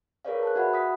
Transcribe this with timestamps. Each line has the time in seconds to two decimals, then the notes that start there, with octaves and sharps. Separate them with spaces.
0.25 G#4 A#4 B4 C#5 D5 F5
0.43 A5 F#6
0.56 F#4 E5 F#5 B5
0.74 D#6 B6